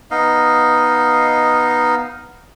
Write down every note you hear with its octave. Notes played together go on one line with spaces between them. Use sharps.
B3 D#4 D#5 F5